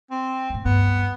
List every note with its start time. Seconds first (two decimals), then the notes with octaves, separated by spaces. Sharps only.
0.11 C4
0.50 E2 A2
0.65 D2 G2 B3